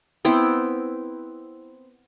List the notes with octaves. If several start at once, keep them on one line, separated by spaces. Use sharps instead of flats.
B3 C4 E4 G5